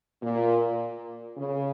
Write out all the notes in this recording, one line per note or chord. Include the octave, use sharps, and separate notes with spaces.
A#2
C#3